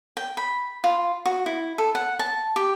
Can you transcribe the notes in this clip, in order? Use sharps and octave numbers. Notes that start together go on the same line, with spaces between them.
G5
B5
F4
F#4
E4
A4
F#5
A5
G4